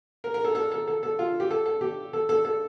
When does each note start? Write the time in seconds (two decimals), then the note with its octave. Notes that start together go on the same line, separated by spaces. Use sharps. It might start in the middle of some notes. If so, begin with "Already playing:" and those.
0.24 A#4
0.34 A#4
0.45 A4
0.55 A4
0.72 A4
0.88 A4
1.03 A4
1.19 F4
1.40 G4
1.51 A4
1.66 A4
1.81 G4
2.13 A4
2.29 A4
2.45 A4